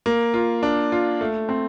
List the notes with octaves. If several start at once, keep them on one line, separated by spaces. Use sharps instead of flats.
A#3
F4
D4
F4
A3
C4